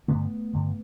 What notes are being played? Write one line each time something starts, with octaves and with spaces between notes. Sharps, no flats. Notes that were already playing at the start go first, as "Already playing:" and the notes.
G2 D3 A3 B3
G2 D3